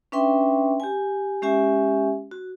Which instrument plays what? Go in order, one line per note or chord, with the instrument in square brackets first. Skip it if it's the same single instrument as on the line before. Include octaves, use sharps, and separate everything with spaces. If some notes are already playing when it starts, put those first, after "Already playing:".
[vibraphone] C#4 D4 B4 E5 G5 C6
G4 G#5
G#3 C#4 G4 E5 G#5
F#4